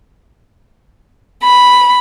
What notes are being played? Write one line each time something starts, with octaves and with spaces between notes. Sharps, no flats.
B5